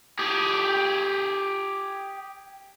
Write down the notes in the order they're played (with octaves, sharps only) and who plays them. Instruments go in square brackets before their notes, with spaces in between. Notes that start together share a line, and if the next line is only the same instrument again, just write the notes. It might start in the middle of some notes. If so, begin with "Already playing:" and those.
[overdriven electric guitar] G4 G#4